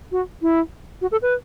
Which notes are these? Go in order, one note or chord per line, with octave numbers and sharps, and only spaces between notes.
F#4
E4
F#4
A4
B4